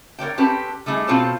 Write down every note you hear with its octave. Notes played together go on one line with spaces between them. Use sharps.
A#4 C#5 D5 G5
C4 C#4 G4 A4 B4
G3 A3 D#4 G#4
B2 C4 F4 A4 C5 C#5